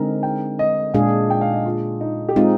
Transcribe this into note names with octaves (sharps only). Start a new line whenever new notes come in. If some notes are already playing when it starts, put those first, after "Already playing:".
Already playing: D3 G#3 C4 D#4 A#4
G5
D#5
A#2 G#3 D4 G#4 F5
G5
F5
D#5
F4
D#4
G4
G#3 C4 D#4 F4